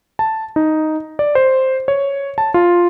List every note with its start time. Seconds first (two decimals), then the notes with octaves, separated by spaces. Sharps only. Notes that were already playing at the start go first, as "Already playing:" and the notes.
0.19 A5
0.56 D#4
1.19 D5
1.35 C5
1.88 C#5
2.38 A5
2.54 F4